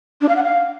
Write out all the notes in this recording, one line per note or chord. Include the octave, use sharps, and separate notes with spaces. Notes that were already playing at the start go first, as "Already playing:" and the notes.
D4
F5
F#5
F5